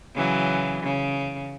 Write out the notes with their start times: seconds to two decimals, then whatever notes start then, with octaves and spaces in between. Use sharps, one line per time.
0.15 C#3 E3 F#3
0.83 C#3